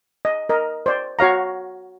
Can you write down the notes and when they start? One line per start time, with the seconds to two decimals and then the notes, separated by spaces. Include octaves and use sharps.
0.25 D#5
0.49 A#4 D#5
0.86 C5 D5
1.19 F#4 C#5 F5 A#5